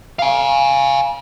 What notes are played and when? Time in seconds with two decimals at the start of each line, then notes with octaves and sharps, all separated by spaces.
0.19 F5 G#5